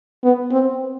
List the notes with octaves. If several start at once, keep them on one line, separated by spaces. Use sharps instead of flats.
B3
C4